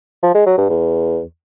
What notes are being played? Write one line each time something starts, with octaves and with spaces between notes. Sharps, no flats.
F3
G#3
F#3
G2
E2